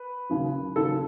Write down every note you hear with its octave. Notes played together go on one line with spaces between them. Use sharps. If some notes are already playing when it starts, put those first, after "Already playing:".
Already playing: B4
D#2 C#3 F#3
D#2 C#3 F#3 A4